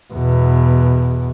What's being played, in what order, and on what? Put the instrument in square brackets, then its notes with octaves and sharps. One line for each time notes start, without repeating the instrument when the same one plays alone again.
[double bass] E2 B2